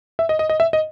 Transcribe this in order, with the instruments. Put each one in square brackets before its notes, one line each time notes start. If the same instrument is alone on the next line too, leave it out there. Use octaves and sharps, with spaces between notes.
[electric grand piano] E5
D#5
D#5
D#5
E5
D#5